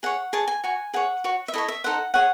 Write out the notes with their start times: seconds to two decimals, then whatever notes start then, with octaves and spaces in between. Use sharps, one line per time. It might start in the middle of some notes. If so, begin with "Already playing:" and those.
0.03 G#4 C#5 F#5
0.33 G#4 C#5 A5
0.48 G#5
0.64 F#4 C#5 G#5
0.94 G#4 C#5 F#5
1.24 F#4 C#5
1.48 E5
1.54 E4 A4 C#5 D#5
1.68 E5
1.84 D#4 A4 C5 F#5
2.14 G#4 C#5 F#5